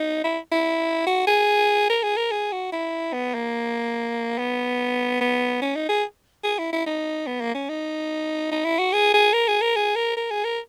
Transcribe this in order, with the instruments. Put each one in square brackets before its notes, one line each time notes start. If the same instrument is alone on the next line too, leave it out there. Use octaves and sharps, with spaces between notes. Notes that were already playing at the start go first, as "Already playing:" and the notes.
Already playing: [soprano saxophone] D#4
E4
E4
F#4
G#4
A#4
G#4
A#4
G#4
F#4
E4
B3
A#3
B3
B3
C#4
D#4
G#4
G#4
E4
E4
D#4
B3
A#3
C#4
D#4
D#4
E4
F#4
G#4
G#4
A#4
G#4
A#4
G#4
A#4
A#4
G#4
A#4